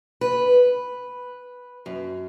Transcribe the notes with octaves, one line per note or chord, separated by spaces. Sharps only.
B4
F#2